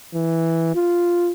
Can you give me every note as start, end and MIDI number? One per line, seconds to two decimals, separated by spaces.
0.14 0.73 52
0.76 1.33 65